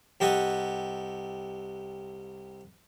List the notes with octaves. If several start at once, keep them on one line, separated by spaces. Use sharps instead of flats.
C2 G4 A4 D#5 F#5 C#6